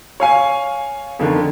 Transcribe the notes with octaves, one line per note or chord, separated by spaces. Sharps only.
C#5 F5 G#5
F2 D3 D#3